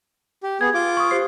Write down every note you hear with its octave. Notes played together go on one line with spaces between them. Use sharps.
G4
B3 G#4 G#6
F4 D6
C#6 D#6
G4 C5 C7